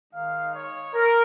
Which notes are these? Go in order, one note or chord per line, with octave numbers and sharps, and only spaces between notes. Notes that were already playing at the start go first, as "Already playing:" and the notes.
D#3 G#3 D#4 F5
C#5
A#4